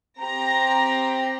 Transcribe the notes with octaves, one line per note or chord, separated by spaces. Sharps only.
C4 G4 A#5